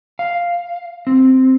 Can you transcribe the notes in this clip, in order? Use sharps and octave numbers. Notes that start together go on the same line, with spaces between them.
F5
C4